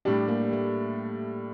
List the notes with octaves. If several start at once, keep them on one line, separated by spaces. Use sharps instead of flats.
A2 G3 D4 G4
A#3
A3